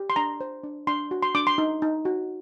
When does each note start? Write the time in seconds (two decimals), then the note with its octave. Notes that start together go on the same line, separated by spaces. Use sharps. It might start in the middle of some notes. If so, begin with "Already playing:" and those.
Already playing: G4
0.10 C6
0.16 D4 A#5
0.41 C5
0.64 D4
0.87 D4 C6
1.11 F#4
1.23 C6
1.35 D4 D6
1.47 C6
1.58 D#4
1.82 D#4
2.05 F#4